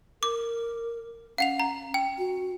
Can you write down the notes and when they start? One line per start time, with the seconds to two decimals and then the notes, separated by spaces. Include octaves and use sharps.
0.23 A#4 D6
1.38 C#4 F5 F#5 F7
1.60 A#5
1.94 G5
2.18 F#4